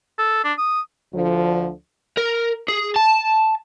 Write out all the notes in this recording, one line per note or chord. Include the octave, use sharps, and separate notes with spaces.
A4
D4
D#6
D2 D3 F3
A#4
G#4
A5